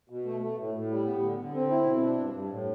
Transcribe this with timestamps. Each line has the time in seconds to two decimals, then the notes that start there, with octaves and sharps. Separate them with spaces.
0.10 B2
0.26 A3
0.41 A3
0.58 A2
0.74 A2
0.91 G3
1.06 B3
1.23 D3
1.38 D3
1.54 C4
1.71 E4
1.86 B2
2.02 D4
2.18 G2
2.34 G2
2.50 A2